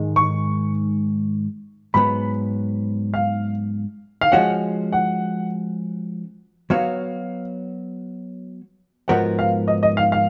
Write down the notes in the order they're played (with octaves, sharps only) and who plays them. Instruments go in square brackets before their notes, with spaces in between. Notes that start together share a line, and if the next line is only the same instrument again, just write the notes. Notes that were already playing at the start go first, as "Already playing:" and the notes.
Already playing: [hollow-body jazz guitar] G#2 D#3 G#3
[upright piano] C#6
[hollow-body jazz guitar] G#2 F#3 B3 [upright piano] B5
[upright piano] F5
F5
[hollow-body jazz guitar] F3 G#3 C#4 F#4 [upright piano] F#5
[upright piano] F#5
[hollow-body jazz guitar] F#3 B3 F#4 C#5 [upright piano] F5
[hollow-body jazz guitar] G#2 F3 B3 F#4 A#4 [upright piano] F#5
[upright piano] F5
D#5
D#5
F5
F5